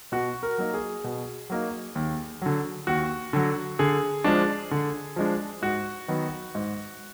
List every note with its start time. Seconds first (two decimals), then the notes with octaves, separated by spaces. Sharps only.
0.12 B2 F#4
0.43 A#4
0.58 F#3 A#3 D#4
0.74 G#4
1.04 B2
1.50 F#3 A#3 D#4
1.95 D#2
2.42 D3 F#3
2.87 D#2 F#4
3.33 D3 F#3
3.79 D3 G#4
4.24 F3 G#3 D4
4.71 D3
5.16 F3 G#3 D4
5.62 G#2 F#4
6.08 D#3 F#3 B3
6.55 G#2